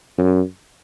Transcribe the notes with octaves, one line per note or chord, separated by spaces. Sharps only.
F#2